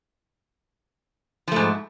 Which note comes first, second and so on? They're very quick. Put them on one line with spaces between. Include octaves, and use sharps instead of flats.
F3 A3 G#2